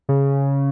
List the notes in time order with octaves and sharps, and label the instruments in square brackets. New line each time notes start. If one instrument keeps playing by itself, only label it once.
[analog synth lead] C#3